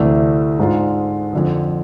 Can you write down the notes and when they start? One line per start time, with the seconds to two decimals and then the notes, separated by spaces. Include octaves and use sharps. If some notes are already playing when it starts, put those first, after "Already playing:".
Already playing: D2 C3 E3 A3 D4
0.59 G#2 G#3 D4 F4
1.33 F2 D3 F3